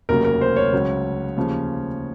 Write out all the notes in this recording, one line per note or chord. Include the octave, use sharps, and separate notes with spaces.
F1 D#2 C#3 F#3 A#4
A#4
C5
C#5
C#2 C#3 F#3
D#2 C#3 F3